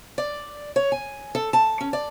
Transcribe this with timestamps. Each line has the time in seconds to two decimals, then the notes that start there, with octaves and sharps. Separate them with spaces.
0.18 D5
0.76 C#5
0.92 G#5
1.35 A4
1.53 A5
1.81 C#4
1.93 D5